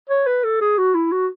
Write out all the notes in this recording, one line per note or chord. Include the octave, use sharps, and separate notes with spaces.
C#5
B4
A4
G#4
F#4
E4
F#4